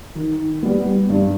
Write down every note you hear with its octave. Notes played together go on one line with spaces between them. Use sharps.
D#3
G3 B3
G2